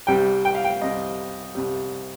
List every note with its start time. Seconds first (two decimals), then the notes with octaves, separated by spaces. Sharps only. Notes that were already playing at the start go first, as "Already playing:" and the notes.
0.07 C2 C3 G3 G5
0.45 G5
0.55 F5
0.64 G5
0.81 C2 C3 G3 D#5
1.55 C2 C3 G3